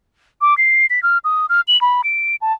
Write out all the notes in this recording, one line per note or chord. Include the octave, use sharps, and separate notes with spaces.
D6
C7
B6
F6
D#6
F6
F#7
B5
D7
A5